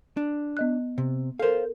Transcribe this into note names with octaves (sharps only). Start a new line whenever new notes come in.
D4
B3 D#5 F#6
C3
A4 A#4 C5 F5